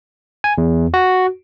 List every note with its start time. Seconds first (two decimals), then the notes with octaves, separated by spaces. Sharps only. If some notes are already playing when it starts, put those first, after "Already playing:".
0.44 G#5
0.58 E2
0.94 F#4